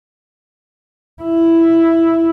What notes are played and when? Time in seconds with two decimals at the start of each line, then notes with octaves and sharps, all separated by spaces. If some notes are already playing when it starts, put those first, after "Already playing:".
1.23 E4